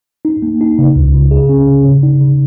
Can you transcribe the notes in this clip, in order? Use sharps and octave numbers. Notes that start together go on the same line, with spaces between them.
D#4
A#3
D#4
C#3
C#2
C#3
G#4
C#4
C#3
C#3
D#4
C#3